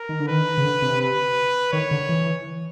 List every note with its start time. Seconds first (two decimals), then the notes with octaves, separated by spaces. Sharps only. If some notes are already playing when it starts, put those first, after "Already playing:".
Already playing: A#4
0.09 D#3
0.20 D3
0.28 D#3 B4
0.58 C#3
0.64 D3
0.82 C3
1.01 B4
1.73 D#3 C#5
1.91 D3
2.09 E3